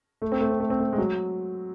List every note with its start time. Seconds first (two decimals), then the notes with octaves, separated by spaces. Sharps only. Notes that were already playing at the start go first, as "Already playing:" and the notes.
0.22 A3
0.32 C4
0.41 A3
0.51 C4
0.60 A3
0.70 C4
0.80 A3
0.93 G#3
0.98 F#3